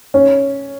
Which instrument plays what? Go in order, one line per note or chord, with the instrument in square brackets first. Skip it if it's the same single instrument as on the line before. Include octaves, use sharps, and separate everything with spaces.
[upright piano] C#4